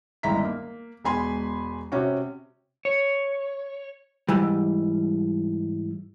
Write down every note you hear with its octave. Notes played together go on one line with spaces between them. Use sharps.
G1 C#2 D#3 E4 A#5 B6
A#3
E1 G#3 B3 G#5 B5 C6
C3 C#4 F#4
C#5
G#2 E3 G3